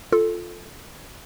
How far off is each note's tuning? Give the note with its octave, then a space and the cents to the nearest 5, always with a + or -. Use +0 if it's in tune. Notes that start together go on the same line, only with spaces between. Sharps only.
F4 +5 A4 +0